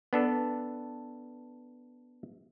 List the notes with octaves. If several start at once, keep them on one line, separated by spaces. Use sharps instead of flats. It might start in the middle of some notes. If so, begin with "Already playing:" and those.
B3 D4 A4